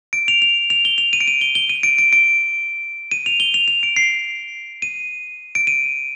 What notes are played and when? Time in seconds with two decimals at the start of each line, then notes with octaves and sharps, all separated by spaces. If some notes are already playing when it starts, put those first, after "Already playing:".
0.13 D7
0.28 F7
0.42 F7
0.70 F7
0.85 G7
0.98 F7
1.13 D#7
1.21 D7
1.27 D#7
1.41 G7
1.55 G7
1.69 D#7
1.83 D7
1.99 D7
2.13 D7
3.11 D#7
3.26 F7
3.40 G7
3.54 F7
3.68 F7
3.83 D7
3.96 C7
4.82 D#7
5.55 D7
5.67 D#7